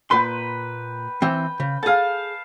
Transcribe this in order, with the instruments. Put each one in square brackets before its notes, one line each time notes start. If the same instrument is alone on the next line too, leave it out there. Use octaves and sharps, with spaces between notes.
[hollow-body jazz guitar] A#2 C6 [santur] B4 G5
[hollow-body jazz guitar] E3 C4 [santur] G5
[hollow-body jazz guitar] C#3
[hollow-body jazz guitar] G#4 A4 [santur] F5 A5